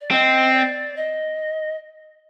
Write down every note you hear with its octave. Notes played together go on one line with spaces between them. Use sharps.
D5
C4 D#5
D5
D#5